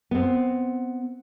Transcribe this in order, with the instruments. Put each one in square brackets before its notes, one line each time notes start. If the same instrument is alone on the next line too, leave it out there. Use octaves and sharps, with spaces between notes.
[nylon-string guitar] B3 C4